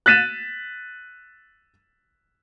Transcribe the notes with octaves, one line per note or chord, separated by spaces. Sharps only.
F#6 A6 B6 D#7 E7